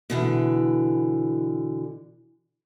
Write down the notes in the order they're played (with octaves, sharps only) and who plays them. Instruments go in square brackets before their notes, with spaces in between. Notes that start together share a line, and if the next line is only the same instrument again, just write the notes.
[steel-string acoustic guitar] B2 D3 E3